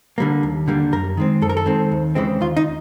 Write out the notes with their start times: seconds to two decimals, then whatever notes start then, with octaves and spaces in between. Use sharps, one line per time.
0.18 D3 G3 A#3
0.43 D#2
0.68 D3 G3 A#3
0.92 F#2 A#4
1.17 D#3 G#3 C4
1.42 F#2 A4
1.49 A#4
1.57 A4
1.66 D#3 G#3 C4
1.92 D#2
2.15 C#3 E3 G#3 C4
2.41 D#2 F4
2.57 D#4